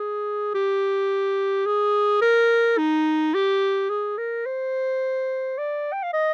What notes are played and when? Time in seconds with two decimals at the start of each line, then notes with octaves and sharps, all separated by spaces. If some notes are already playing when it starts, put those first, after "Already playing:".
Already playing: G#4
0.55 G4
1.66 G#4
2.21 A#4
2.78 D#4
3.34 G4
3.90 G#4
4.18 A#4
4.46 C5
5.58 D5
5.93 G5
6.03 F5
6.13 D#5